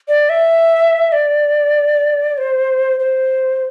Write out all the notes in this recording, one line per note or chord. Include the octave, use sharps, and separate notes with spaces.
D5
E5
D5
C5
C5